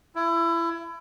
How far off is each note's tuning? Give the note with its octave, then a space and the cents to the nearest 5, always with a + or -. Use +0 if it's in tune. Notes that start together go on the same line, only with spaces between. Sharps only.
E4 +25